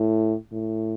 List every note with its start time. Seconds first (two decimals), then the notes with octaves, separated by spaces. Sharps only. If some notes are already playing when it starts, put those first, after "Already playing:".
Already playing: A2
0.52 A2